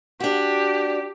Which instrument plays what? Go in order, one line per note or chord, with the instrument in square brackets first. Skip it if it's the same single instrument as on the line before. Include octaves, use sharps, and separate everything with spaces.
[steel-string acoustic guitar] D4 F#4 [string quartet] G4